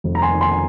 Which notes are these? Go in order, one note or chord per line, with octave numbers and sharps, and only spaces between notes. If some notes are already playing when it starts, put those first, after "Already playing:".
F1
A#5
G#5 C6
D#3
G#5 C6
G#5